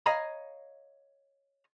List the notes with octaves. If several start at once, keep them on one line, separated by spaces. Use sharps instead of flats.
C#5 D#5 F5 G#5 A#5 B5